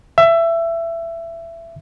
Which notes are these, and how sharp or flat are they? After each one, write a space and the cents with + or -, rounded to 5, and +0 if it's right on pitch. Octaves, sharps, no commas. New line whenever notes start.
E5 +20